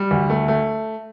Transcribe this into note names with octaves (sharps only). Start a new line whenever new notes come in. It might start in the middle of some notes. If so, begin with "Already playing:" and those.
Already playing: G3
D2
A3
A3